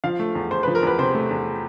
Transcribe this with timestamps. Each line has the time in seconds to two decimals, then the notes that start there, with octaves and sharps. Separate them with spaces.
0.04 F3 F5
0.19 A3
0.35 E2
0.51 E2 C5
0.63 B4
0.67 F3
0.75 A#4
0.83 E2 B4
0.98 C3 C5
1.15 A3
1.31 E2